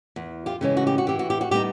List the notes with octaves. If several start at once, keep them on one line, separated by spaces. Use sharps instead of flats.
E2
F4 G4
C#3 E3 G#3 C#4
F#4
G4
F#4
E3 G4
F#4
G4
F#4
G3 B3 D#4 G4